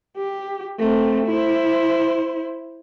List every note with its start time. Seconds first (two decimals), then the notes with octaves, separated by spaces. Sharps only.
0.18 G4
0.79 A3 C4
1.27 E4 C5